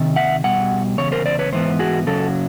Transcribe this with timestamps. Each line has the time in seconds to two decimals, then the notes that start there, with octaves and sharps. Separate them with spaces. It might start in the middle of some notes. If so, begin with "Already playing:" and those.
Already playing: C3 D#3
0.16 E5 F#5
0.44 B2 G3 F#5
0.98 E2 C#3 C#5
1.12 A#4 C5
1.26 C5 D5
1.39 B4 C#5
1.52 G#2 E3 B3 C5
1.79 F#4 G#4
2.07 F#2 C#3 F#3 A4